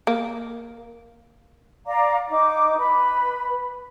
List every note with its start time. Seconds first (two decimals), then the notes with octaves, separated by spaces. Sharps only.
0.07 A#3
1.86 D5 F5 A#5 D6
2.29 D#4 D6
2.78 B4 B5